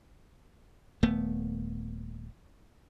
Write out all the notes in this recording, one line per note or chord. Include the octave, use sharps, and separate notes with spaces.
D#1 A3 B3